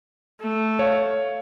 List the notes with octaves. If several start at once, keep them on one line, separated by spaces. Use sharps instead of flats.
A3
C#5 F5